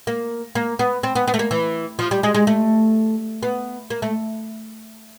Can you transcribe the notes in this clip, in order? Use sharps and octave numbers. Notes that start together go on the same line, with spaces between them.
A#3
A#3
B3
C4
B3
B3
A3
A#3
E3
F3
G3
G#3
G#3
A3
B3
A#3
A3